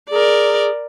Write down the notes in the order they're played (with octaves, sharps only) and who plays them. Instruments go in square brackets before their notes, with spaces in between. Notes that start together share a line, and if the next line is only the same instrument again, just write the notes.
[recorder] G#4 [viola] A#4 D5